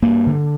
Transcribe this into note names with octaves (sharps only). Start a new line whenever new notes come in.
G2 A#3
D3